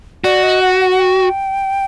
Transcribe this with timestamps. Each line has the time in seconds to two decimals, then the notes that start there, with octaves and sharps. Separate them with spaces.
0.24 F#4 D5
0.43 D#5
0.62 F#5
0.80 F#5
0.91 F#5
0.99 G5